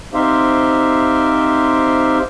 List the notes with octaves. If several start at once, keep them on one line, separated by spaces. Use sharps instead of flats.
C4 D#4 G4 C5 E5 F5